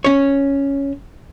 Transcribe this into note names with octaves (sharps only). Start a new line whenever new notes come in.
C#4 C#5